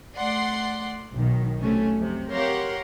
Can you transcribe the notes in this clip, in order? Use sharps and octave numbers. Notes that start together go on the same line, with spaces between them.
A3 D5 F#5 C6 C7
B1 D#3
C3 F#3 A3 C#4
F2 C3
G4 A#4 C#5 F5 F#5 C6